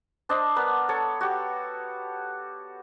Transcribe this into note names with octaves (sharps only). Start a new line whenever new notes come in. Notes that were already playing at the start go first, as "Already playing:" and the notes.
D4 C5 D#5
B3 D4 A#4 B4
A4 C#5
F#4 G4